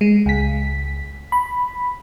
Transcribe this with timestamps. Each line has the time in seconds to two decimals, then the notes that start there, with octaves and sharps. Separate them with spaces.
0.01 G#3
0.26 C#2 B6
1.32 B5